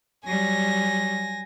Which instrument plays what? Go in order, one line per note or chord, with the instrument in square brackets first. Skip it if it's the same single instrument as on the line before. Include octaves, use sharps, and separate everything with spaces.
[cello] F#3 G3 [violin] G#5 A#6